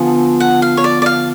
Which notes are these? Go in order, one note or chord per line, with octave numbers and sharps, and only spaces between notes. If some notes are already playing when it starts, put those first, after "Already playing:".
Already playing: D3 F3 B3 F4 G#4
F#5
F5
C#5
D5
D5
F5